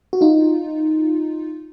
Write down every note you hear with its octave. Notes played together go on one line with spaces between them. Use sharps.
F#4
D#4 F4